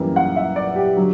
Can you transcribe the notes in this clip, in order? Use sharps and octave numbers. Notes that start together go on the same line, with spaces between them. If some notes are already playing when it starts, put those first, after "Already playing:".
Already playing: F#2 E3 G3 A#3
F#5
E5
D5
G4
D3 F#3